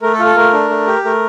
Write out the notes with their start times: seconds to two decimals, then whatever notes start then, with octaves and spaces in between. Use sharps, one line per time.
0.02 A3 A#4
0.14 A4
0.19 F4
0.25 A4
0.36 A3 A#4
0.53 D4
0.70 A3
0.87 G4
1.05 A3 A#4